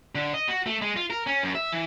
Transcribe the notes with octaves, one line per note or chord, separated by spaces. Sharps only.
D3
D#5
F#4
A3
G#3
F4
A#4
C#4
F#2
E5
E3